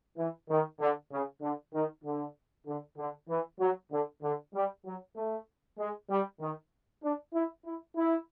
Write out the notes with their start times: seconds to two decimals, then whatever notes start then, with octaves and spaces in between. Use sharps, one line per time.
0.18 E3
0.49 D#3
0.80 D3
1.12 C#3
1.42 D3
1.74 D#3
2.04 D3
2.67 D3
2.98 D3
3.29 E3
3.60 F#3
3.91 D3
4.22 D3
4.54 G3
4.86 F#3
5.16 A3
5.78 G#3
6.10 G3
6.40 D#3
7.03 D4
7.34 E4
7.65 E4
7.96 E4